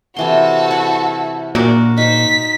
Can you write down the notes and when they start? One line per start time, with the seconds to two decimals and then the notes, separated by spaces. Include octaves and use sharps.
0.16 C3 E3 F#4 A4 C6
0.71 E4 F#5
1.55 A#2 D4 F#4 A#4
1.98 D#4 C5 B6